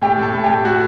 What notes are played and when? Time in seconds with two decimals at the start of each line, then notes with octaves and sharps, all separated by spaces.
0.02 A2 G4
0.18 A2 A4
0.34 A2
0.44 A2 G4
0.64 A2 F#4